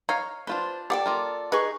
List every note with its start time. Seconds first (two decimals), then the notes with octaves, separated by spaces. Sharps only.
0.09 D#4 C#5 F5
0.47 D4 F4 B4 C5
0.90 G4 A4 D5 F#5 G5
1.06 A#3 F4 A#4
1.52 D#4 G#4 B4 C#6